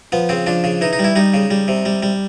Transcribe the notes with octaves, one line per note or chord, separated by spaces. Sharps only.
F3 B3
C#3 C4
F3 D4
C#3
E3 D#4
D#4
G3
E4
G3 D#4
C#3
G3
C3
G3
G3